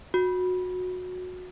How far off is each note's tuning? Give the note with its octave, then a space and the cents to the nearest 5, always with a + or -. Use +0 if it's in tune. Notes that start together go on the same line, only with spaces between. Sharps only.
F#4 -20